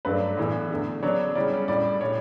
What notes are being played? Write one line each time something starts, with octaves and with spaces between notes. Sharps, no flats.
G2 F#3 A3 D4 B4
A2 E3 B3 D4
E2 D3 A3
C#3 F#3 B3 D4 C#5
C#3 G3 C#4 E4 D5
A2 G3 D4 D5
A2 G3 D4 C#5